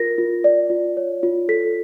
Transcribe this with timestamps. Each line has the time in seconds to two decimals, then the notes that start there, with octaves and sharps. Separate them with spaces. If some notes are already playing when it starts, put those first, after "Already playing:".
Already playing: F4 A#4 A#6
0.18 F4
0.44 D5
0.70 F4
0.97 C#5
1.23 F4
1.49 A4 B6